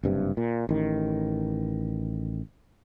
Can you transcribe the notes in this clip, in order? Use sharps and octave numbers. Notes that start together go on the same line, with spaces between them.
F#1 G2 C3
A#2
A1 D#3